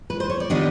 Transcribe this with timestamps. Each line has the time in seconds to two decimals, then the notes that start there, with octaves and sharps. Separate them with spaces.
0.10 B4
0.20 C5
0.30 C#5
0.40 D5
0.50 D#3 G3 B3 D4 D#5